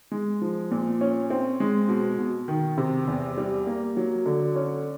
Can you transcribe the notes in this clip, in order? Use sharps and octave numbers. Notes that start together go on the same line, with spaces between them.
G#3
F3
A#2
C#4
C4
G#3
B2
B2
D#3
C3
E2
G3
A#3
F#3
D3
C#4